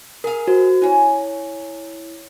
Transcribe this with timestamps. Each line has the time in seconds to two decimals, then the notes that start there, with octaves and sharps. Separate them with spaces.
0.24 G#4 A#4 F5
0.48 F#4 C5
0.82 C#4 E4 G#5